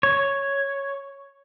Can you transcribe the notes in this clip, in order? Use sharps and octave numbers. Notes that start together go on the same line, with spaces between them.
C#5